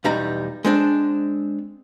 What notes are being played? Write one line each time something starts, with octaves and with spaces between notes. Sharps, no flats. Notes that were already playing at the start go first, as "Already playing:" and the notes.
B1 E2 G3 D#4 A#5
G#3 C4 D4